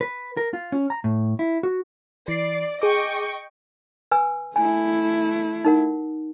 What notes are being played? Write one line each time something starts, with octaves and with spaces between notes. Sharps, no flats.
B4
A#4
F4
C#4
A#5
A2
E4
F#4
E3 D5 C7
G#4 D#5 G5 C#6 D6
B4 G#5 E6
A3 E4 G#5
D#4 A#4 F#5